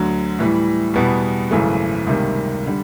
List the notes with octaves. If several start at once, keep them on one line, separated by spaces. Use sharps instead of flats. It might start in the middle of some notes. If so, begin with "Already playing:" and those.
Already playing: D2 D3 F#3
A2 E3 G3
E2 B2 G3 B3
G#1 F#2 C#3 E3 A3
C#2 C3 D#3 G3 A#3
D3 G3